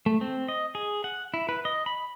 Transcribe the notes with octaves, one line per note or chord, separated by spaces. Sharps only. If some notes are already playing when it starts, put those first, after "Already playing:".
A3
C4
D#5
G#4
F#5
E4
B4
D#5
B5